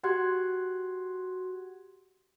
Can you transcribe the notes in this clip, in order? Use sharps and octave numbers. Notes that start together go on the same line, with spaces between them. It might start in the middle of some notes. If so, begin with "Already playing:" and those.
F#4 G4 F#5 C6 F#6 G#6